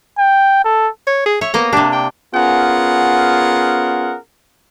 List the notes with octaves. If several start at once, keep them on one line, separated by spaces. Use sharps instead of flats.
G5
A4
C#5
G#4
C#5 E5
A#3 B3 D#5
C3 D4 G4
G5
B3 C#4 F4 G#4 A#4 F#5